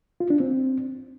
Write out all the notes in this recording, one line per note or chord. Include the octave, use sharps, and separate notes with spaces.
F4
D4
C4